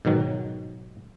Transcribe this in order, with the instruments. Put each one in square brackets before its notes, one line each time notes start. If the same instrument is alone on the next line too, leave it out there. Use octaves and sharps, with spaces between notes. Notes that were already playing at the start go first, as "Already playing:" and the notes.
[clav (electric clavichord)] G#2 B2 D#3 F#3